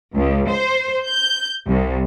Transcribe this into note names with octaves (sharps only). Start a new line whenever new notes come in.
C#2
C5
G6
C2